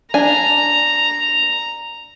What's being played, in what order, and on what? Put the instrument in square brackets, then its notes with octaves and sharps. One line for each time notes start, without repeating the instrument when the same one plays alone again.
[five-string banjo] D4 G#5 [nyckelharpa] A#5